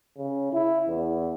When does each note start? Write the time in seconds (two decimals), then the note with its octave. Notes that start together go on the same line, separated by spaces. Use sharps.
0.18 C#3
0.53 E4
0.89 E2